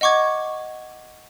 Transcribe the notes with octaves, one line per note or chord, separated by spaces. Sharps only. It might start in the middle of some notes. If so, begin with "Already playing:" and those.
D#5 F#5 C#6 D6 G#6